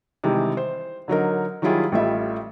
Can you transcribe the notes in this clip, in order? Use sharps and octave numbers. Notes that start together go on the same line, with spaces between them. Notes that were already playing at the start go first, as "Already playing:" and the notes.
C3 D#3 E3 G3 G#3
C5
D3 F#3 D#4 A#4
D#3 F#3 G3 E4 F4 G#4
A1 G3 A3 F4 D#5 E5